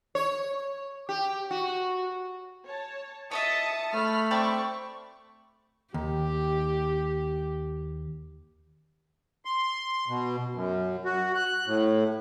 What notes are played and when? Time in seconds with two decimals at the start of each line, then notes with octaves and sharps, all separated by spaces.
0.15 C#5
1.09 G4
1.51 F#4
2.65 C#5 A5
3.31 C#5 D#5 E5 A5 D#6 A6 C#7
3.94 A3 B5 F6
4.31 C4 A4 D5 G5 C#6
5.94 D#2 G4
9.45 C6
10.08 B2
10.55 F#2
11.05 F#4
11.35 F#6
11.67 A2